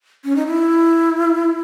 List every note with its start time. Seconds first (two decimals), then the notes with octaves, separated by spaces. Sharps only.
0.24 C#4
0.36 D#4
0.47 E4